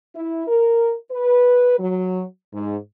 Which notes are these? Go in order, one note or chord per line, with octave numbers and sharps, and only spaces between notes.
E4
A#4
B4
F#3
G#2